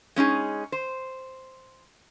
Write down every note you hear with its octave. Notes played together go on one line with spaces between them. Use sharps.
G#3 C#4 D#4 G#4
C5